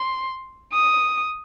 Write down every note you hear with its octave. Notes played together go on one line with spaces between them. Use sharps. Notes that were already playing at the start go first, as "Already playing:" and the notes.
Already playing: C6
D#6